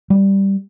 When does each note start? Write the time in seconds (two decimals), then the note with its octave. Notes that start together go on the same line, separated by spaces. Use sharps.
0.10 G3